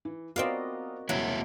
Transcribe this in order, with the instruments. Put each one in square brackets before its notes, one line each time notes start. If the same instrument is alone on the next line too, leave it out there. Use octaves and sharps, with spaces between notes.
[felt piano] E3
[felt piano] B3 F4 [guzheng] C4 D5 F5 [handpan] F#4 A#4 D#5
[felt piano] E1 C2 [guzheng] F#3 [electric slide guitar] A#3 E4